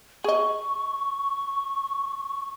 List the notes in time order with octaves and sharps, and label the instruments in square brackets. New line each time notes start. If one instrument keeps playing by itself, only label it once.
[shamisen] G#4 D#5 [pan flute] C#6